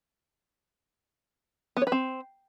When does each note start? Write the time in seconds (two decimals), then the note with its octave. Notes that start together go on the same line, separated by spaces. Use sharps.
1.77 B3
1.82 C#5
1.87 B4
1.92 C4